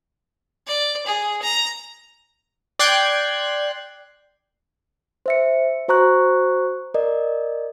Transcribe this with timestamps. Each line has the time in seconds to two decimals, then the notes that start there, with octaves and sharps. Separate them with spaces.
0.66 D5
1.06 G#4
1.42 A#5
2.79 D5 G5 C6 F#6 G#6
5.26 C5 E5 C#7
5.88 F#4 C5 A#5 C#6 F#6
6.94 A#4 D5 D#5